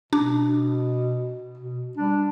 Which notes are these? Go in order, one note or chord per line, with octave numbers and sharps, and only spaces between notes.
B2 D4
B2
G3 D4